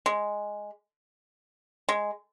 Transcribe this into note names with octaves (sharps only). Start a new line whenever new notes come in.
G#3
G#3